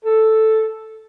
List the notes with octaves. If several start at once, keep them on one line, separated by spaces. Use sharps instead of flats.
A4